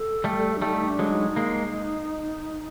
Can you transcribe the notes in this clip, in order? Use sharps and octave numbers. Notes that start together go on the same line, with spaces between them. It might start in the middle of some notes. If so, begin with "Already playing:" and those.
Already playing: A4
G3 A3
D4
G3 A3 D#4
D4
F#3 G#3
D#4
G#3 A#3